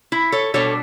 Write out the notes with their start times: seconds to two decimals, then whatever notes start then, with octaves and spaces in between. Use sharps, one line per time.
0.12 E4
0.32 A4 C#5
0.54 B2 G3 D4 A4 C#5